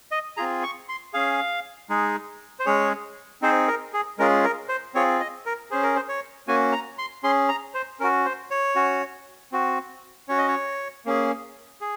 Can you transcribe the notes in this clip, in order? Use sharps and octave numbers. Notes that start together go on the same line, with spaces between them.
D#5
C4 F4 G#4 A#5
C#6
C6
C#4 G#4 F5
G#3 D#4 G#4
C5
G#3 C#4 G#4 C#5
C4 D#4 G#4 C5
A#4
G#4
G#3 C#4 F4 G#4 A#4
A#4
C5
C4 F4 G#4 C#5
D#5
A#4
C#4 G#4 C5
A#4
C5
C#5
A#3 C#4 F#4 G#5
A#5
C6
C#4 G#4 C6
A#5
C5
C#4 F#4 A#4
C5
C#5
C#4 F#4
C4 F#4
C#4 F#4 C#5
D#5
C#5
A#3 C#4 G#4
G#4